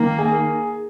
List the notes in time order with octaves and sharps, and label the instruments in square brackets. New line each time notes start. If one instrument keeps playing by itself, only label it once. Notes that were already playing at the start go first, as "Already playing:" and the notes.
Already playing: [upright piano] D#3 [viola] A#3
[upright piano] G#4